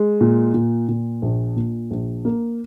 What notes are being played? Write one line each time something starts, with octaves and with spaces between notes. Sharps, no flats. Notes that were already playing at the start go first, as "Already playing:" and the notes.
Already playing: G#3
A#2
A#2
A#2
A#1
A#2
A#1
A#3